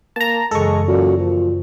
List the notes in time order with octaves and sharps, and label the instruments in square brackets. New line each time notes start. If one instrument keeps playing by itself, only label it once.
[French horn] A#3 [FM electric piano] A5 A#5
[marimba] F#2 C#3 E3 [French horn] G#3 [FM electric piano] A4 C#6
[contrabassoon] F#2 [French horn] A#2 [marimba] D5
[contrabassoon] A#2 [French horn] F3